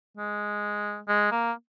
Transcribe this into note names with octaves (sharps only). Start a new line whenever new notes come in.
G#3
G#3
A#3